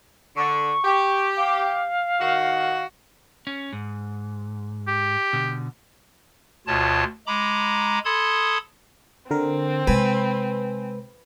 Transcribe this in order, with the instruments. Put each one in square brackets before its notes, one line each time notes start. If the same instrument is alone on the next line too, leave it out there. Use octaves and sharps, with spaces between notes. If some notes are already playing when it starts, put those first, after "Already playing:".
[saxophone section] D3 [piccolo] C#6
[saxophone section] G4
[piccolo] F5
[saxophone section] D#3 F#4
[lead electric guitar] C#4
G#2
[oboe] G4
[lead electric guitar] B2 D3
[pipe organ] D2 B2 F4 C#5 A5
G#3 A#5 B5 D6
A4 A5 B5 C6 D#6 G#6
[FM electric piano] D3 A#4 [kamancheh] C4
[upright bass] C3 G#3 [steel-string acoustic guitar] B4 [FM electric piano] G#5